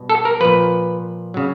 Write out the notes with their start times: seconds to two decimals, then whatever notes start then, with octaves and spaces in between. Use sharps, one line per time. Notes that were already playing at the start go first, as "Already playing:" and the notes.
Already playing: B2 G3
0.10 A4
0.25 A#4
0.41 A#2 F3 B4
1.34 C#3 F#3